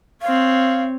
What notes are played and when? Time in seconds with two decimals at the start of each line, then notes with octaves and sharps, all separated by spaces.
0.22 C4 C#5 F5